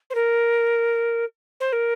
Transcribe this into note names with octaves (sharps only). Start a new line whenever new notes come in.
C5
A#4
C5
A#4